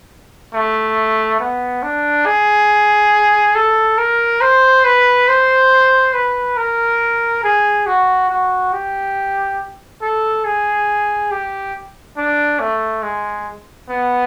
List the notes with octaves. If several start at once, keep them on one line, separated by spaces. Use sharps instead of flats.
A3
B3
D4
G#4
A4
A#4
C5
B4
C5
B4
A#4
G#4
F#4
F#4
G4
A4
G#4
G4
D4
A3
G#3
B3